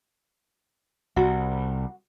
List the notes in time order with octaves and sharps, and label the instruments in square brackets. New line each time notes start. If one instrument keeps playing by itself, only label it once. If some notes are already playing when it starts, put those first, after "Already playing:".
[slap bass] C2 [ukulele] F#4